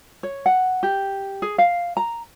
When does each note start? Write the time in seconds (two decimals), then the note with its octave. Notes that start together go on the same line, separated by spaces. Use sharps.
0.23 C#5
0.46 F#5
0.83 G4
1.42 G#4
1.58 F5
1.97 A#5